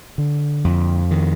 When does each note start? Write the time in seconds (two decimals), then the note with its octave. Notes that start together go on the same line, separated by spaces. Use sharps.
0.18 D3
0.65 F2
1.11 D#3